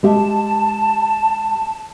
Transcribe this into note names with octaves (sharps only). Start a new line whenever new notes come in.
G#3 G4 E5 A5